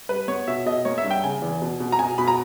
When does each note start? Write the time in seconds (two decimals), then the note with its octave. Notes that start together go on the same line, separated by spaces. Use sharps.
0.09 G3 B4
0.28 B3 C#5
0.48 B2 E5
0.66 B2 D#5
0.85 A#3 C#5
0.98 E5
1.04 G2
1.11 G5
1.24 C#3 G#5
1.42 E2
1.62 B2
1.80 B2
1.92 A#5
1.99 B2 G#5
2.18 B2 B5
2.28 A#5